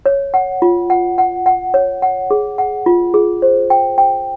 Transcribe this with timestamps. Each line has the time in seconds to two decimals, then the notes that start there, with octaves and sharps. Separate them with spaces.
0.06 C#5
0.34 F#5
0.62 F4
0.90 F#5
1.18 F#5
1.46 F#5
1.74 C#5
2.02 F#5
2.31 G#4
2.58 F#5
2.86 F4
3.14 G#4
3.42 C5
3.70 G5
3.98 G5